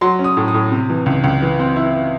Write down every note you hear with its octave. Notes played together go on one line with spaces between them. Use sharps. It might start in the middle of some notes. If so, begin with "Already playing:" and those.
F#3 C6
C#4
D#6
A2
D#6
A2
C3
E3
C#2
C#2
E3
C4
E4